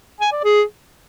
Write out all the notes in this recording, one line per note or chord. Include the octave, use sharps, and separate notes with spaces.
G#5
D5
G#4